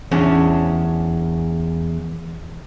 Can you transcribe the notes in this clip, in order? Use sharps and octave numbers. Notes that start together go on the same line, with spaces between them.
E2 C#4 D4